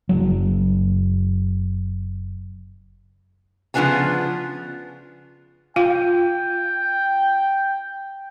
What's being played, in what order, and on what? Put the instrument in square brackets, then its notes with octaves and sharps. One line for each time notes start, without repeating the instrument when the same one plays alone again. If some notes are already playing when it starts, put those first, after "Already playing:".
[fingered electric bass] F#1 F#3
[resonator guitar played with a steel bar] C#3 F3 G#3 B3 D4 G#5
[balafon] F4 F5 [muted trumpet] G5